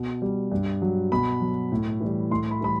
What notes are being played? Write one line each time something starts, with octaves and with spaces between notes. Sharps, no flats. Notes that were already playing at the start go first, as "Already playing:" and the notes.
Already playing: B2
G3
G2
F#3
B2 B5
F#3
A2
E3 G3
A2 C6
B5
E3 G3 B5